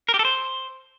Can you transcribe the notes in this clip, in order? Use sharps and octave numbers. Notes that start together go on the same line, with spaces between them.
A#4
G4
A4
C5